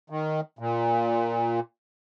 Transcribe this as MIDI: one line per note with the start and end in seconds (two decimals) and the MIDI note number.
0.10 0.41 51
0.59 1.60 46